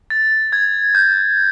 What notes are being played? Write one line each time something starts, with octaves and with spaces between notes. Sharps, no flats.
A6
G#6
G6